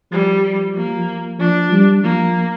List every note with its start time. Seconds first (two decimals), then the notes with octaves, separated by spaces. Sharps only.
0.12 F3 G3
0.76 A#3
1.39 F3 D4
1.72 G3
2.04 F3 A#3